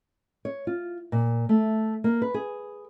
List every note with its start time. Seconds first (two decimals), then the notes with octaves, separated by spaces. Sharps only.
0.45 C#5
0.67 F4
1.12 A#2
1.49 A3
2.04 A#3
2.22 B4
2.34 G#4